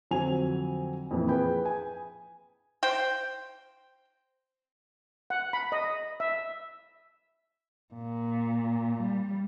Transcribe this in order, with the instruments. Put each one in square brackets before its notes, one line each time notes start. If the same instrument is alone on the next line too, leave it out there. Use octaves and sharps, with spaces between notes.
[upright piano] F2 D3 F#3 C4 G#5 F7
F2 A#2 E3 F3
G#4 B4 G5 B5
G#5
[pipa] C5 G5
[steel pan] F#5
B5
D#5
E5
[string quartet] A#2
G3